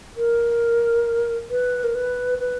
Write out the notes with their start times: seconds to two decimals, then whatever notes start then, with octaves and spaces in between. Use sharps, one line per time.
0.17 A#4
1.50 B4
1.84 A#4
1.95 B4
2.39 B4